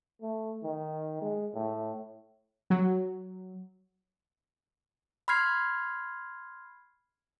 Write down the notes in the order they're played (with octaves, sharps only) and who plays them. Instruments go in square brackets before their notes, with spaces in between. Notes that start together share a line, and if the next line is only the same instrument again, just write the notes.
[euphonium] A3
D#3
G#3
A2
[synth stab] F#3
[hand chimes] B5 C6 F6 G#6 C7